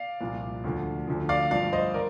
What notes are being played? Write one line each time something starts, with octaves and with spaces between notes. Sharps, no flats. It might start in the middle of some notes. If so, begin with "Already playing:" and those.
Already playing: D5 F5
C2 A#2 F3
D2 D3 F3
D2 D3 F3
D5 F5
G2 F3 D5 F5
C5 D#5
A#4 D5